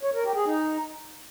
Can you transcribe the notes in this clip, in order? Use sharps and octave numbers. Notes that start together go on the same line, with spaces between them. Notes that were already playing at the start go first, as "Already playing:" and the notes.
C#5
A#4
G4
G#4
D#4